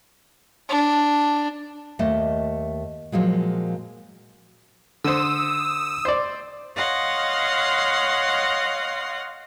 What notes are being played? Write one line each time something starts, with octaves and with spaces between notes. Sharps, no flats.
D4
D#2 A3 D#5
A#2 F3 F#3 G#3
D3 C5 D#6 E6
C5 D5
C#5 D#5 F5 F#5 C6